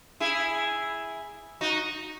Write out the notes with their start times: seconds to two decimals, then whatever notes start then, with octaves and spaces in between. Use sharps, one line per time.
0.20 E4 G#4
1.61 D#4 F#4